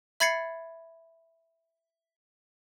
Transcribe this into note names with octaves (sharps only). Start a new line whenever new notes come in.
E5 B5 G#6 A6 C7 C#7